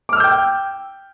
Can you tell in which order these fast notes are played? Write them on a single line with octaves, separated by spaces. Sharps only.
D6 F6 E6 G6 G5